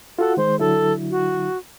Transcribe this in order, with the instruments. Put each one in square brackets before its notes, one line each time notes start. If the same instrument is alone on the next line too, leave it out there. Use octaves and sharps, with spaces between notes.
[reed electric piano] F4 F#4 F#5 [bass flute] A4
[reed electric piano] D#3 G#3 [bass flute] C5
[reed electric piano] D3 F#3 E4 [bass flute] A4
[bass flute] F#4